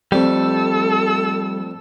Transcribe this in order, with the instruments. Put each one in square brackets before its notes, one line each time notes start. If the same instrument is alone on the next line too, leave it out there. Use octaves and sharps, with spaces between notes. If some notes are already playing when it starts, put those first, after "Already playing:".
[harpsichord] F2 D5 [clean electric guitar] G3 A3 [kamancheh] A4 E6